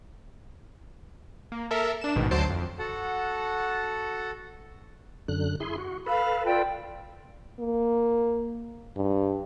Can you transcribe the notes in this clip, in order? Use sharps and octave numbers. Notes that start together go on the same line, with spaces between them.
A#3
A4 A#4 E5
D4 E7
A1 G#2 B2 D#3
D2 F#3 C5 A5 C7 D7
F2
F#4 A4 F#5 A5
F#2 D3 F#6
E4 G#4 C6
F#4
A4 B4 F5 B5
F4 D5 G5
A#3
G2